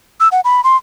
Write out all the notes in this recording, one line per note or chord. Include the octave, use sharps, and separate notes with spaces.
E6
F#5
B5
C6